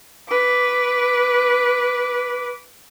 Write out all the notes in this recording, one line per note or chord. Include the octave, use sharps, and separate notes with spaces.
B4 D6